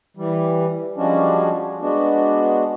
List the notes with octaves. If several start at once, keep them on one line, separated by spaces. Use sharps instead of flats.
E3 G3
F3 G3 G#3 C#4 D4 F#4
G#3 B3 D4 F#4